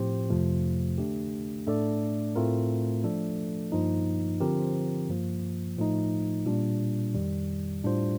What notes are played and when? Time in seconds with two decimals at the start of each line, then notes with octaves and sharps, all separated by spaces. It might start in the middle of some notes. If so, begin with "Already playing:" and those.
Already playing: A2 F3 C4 G4 C5
0.30 F2 C3 F3 A3
0.98 D3 A3 D4 G4
1.67 A2 A3 D4 A4 D5
2.36 A2 A3 C4 F4 A#4
3.04 F3 A3 D4 A4 D5
3.72 G2 F3 A#3 D#4
4.40 D3 F3 C4 G4 A#4
5.09 G2 F3 A#3
5.77 A2 F3 A3 D#4
6.46 A#2 G3 D4
7.14 F2 D#3 G3
7.83 A2 G3 D4 F4 C5